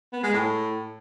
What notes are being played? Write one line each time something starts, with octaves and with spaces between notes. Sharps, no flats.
B3
G#3
A2